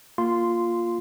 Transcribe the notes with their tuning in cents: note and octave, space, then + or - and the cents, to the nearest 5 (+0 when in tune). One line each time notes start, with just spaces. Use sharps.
A#3 +0 F4 +0 C6 -10